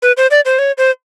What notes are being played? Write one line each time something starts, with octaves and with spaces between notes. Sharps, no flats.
B4
C5
D5
C5
C#5
C5